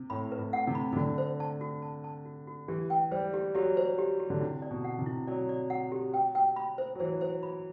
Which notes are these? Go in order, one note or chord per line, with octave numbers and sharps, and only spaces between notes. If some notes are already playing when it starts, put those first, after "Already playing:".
Already playing: C3
A2 B5
B4
A2
F#5
C3
B5
C3
D3 F#4
C5
A5
F#4
A5
A5
F#4
F#4
E3 G4
G5
G3 C5
G4
F#3 G4
C5
G4
G4
D3
C3 E4
D5
B2
F#5
C3
E4
F#3 D5
D5
F#5
G4
G5
G5
B5
C5
F#3
E3 C5
C5
B5